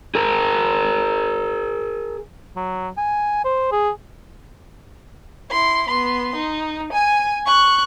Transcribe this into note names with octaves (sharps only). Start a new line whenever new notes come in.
G#4 A#4
F#3
G#5
C5
G#4
E4 C6
B3 C6
D#4
G#5 D#7
C#6 F#6